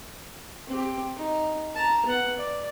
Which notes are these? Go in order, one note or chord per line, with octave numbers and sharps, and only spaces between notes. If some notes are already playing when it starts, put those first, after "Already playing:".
C4 G4
D#4
A5 A#5
B3 F#5
D5